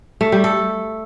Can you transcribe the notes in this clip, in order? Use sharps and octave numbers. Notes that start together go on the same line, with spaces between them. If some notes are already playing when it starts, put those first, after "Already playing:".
A3
G3
A4